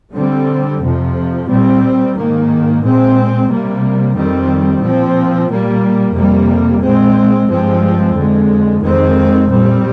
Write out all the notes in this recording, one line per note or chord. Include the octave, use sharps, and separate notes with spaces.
D3 G3 C4
F2 C3 F3
A#2 G3 C4
G#2 D#3 A#3
A#2 G#3 C4
C3 G3 A#3
F2 D#3 G3 C4
A#2 F3 C4
A#2 G3 A#3
F2 C3 G3 A#3
A#2 G#3 C4
G2 F3 G#3 C4
F2 D3 G#3
F2 D#3 G#3 C4
A#2 G3 C4